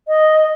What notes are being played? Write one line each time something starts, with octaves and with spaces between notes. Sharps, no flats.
D#5